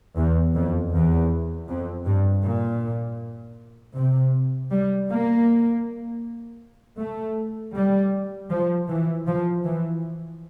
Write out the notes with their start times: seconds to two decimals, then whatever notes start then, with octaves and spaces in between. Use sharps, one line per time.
0.17 E2
0.55 F2
0.93 E2
1.68 F2
2.06 G2
2.44 A#2
3.96 C3
4.72 G3
5.10 A#3
6.99 A3
7.75 G3
8.50 F3
8.89 E3
9.27 F3
9.65 E3